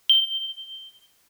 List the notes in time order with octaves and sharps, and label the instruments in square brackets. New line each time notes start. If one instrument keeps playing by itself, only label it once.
[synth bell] G7